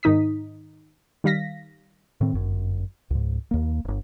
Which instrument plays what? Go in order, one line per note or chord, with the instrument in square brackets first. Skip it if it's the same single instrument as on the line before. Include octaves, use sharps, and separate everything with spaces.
[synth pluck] G#2 D#3 D#4 D#6 B6
D#3 G3 F5 A#6 B6
[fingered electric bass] A2 D#3 C4
G1 F#2
C#2 G#2
D#2 A#3
D1 G1